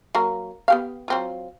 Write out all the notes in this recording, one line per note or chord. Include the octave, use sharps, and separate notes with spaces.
F#3 A#3 A#4
B3 G4 F5
F#3 C4 F4